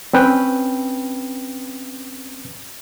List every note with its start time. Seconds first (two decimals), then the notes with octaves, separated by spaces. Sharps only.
0.13 C4 C#4 B4 G5